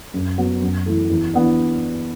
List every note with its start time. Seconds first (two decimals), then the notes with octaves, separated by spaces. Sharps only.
0.14 F#2
0.38 F#3 B3
0.62 F#2
0.86 E3 A3
1.10 E2
1.34 E3 B3 D4